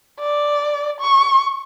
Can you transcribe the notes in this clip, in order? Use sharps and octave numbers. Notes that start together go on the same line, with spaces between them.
D5
C#6